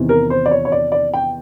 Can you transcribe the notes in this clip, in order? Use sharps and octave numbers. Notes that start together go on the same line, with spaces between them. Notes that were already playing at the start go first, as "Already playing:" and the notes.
Already playing: E2 C3 D#3
A#4
C5
D5
C#5
C#5
D5
D5
G5